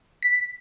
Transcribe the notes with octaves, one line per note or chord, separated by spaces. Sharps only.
B6